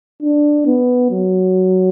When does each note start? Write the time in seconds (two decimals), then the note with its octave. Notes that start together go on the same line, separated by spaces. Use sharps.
0.22 D4
0.66 B3
1.11 F#3